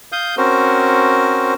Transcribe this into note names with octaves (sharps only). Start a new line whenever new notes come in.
F5 D#6 G6
C4 C#4 F#4 A#4 C5